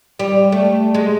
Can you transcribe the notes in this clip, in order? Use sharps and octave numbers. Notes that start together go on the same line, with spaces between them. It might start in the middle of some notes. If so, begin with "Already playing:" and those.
G3
A3
G#3